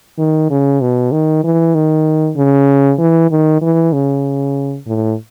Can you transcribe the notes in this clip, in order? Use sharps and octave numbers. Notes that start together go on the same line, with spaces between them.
D#3
C#3
B2
D#3
E3
D#3
C#3
E3
D#3
E3
C#3
A2